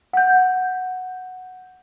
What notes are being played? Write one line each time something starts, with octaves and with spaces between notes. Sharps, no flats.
F#5 G6